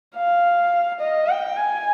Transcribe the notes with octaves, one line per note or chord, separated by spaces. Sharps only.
F5
D#5
G5
G#5